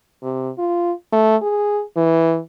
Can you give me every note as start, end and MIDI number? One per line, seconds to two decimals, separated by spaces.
0.23 0.50 48
0.58 0.92 65
1.12 1.36 57
1.42 1.82 68
1.96 2.39 52